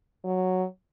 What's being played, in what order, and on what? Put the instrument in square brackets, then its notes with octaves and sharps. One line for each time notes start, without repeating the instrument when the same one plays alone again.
[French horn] F#3